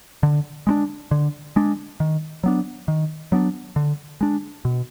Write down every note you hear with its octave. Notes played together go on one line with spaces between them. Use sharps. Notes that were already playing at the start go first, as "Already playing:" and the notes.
D3
G#3 B3 D4
D3
G#3 D4
D#3
F#3 B3 D4
D#3
F#3 B3 D4
D3
G#3 D4
B2